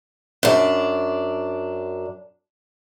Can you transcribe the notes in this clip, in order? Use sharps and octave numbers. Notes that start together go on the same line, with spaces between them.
F#2 D4